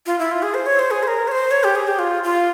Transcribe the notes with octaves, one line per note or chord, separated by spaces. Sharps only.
F4
E4
F4
G#4
C5
C#5
C5
G#4
C5
A#4
C#5
C5
C#5
G4
G#4
G4
F4
F4